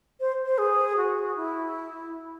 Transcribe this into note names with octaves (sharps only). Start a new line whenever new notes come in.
C5
C5
G#4
F#4
E4